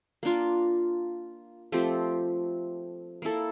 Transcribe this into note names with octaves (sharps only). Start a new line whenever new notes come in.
A#3 D4 F4
F3 A3 C4 G4
A#3 E4 A4